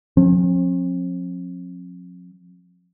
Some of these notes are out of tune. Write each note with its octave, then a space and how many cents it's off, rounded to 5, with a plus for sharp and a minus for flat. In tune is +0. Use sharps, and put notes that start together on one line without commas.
F3 +40 C4 +45